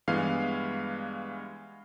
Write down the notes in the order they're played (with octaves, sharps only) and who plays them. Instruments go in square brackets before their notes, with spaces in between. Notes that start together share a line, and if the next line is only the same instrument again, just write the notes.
[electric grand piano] G2 E3 G#3 B3 F5